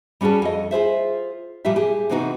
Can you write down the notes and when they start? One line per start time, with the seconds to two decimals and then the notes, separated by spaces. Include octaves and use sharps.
0.21 G3 C#4 F#4 G#4 A4
0.42 F2 D#5
0.71 F4 G#4 C5 E5
1.65 A#2 F3 G3 G4 E5
1.76 G4 G#4
2.10 C3 E3 B3 C4 D#4 F#4